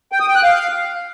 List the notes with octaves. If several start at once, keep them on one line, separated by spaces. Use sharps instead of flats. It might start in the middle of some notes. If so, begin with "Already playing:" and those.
G5
D#6
G5
F#6
F5